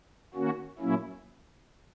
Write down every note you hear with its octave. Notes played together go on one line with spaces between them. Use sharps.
D#3 A#3 C#4 F#4
A#2 F#3 A#3 C#4 E4